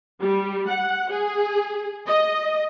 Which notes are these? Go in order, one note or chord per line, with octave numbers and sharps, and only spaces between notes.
G3
F#5
G#4
D#5